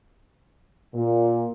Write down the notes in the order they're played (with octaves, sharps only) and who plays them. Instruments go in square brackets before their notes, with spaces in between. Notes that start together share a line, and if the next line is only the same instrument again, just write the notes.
[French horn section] A#2